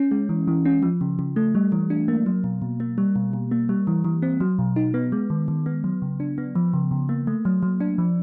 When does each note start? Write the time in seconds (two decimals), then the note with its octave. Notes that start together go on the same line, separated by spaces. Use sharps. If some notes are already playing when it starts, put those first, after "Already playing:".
Already playing: C#4
0.11 G#3
0.29 E3
0.48 E3
0.65 C#4
0.83 F3
1.01 C#3
1.19 C#3
1.36 A3
1.55 G3
1.72 E3
1.90 D4
2.08 A#3
2.26 F#3
2.44 B2
2.62 B2
2.80 A#3
2.98 G3
3.16 B2
3.33 B2
3.51 A#3
3.69 G3
3.87 E3
4.05 E3
4.22 C4
4.40 F#3
4.59 B2
4.76 D#4
4.94 B3
5.12 G#3
5.30 D#3
5.48 D#3
5.66 B3
5.84 F#3
6.02 C#3
6.20 D4
6.38 B3
6.55 F3
6.73 C#3
6.91 C#3
7.09 A#3
7.27 A3
7.45 F#3
7.63 F#3
7.80 D4
7.98 F3